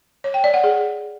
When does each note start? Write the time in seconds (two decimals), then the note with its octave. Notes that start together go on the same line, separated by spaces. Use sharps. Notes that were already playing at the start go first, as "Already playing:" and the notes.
0.24 C#5
0.34 G5
0.44 D5
0.54 F#5
0.64 G#4